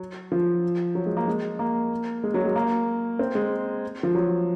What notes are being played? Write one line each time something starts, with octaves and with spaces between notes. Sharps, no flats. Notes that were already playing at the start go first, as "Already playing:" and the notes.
Already playing: F#3
F3
F#3
G#3
A#3
G#3
A#3
G#3
F#3
G#3
A#3
C4
G#3
F3
F#3